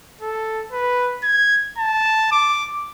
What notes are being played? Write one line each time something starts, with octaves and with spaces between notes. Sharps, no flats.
A4
B4
G#6
A5
D6